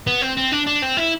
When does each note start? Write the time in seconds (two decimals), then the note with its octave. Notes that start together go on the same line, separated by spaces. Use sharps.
0.07 B3
0.22 C4
0.37 C4
0.52 D4
0.67 D4
0.82 C4
0.97 E4